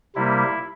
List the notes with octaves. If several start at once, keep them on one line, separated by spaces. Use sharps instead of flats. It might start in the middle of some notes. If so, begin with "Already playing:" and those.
C3 G3 A#3 E4